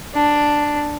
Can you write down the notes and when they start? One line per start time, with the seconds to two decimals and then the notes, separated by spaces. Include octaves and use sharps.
0.14 D4